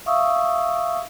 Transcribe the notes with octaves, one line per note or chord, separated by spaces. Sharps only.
E5 F5 C#6 D#6 E6